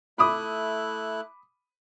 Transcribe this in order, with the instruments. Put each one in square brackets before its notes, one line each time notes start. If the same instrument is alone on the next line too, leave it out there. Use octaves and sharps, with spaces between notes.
[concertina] A3 E4 F#6 [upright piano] B5 D6 D#6